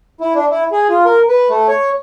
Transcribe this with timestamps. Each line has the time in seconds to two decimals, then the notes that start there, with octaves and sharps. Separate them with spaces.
0.20 E4
0.35 D4
0.51 E4
0.72 G#4
0.89 F4
1.05 A#4
1.29 B4
1.49 A3
1.68 C#5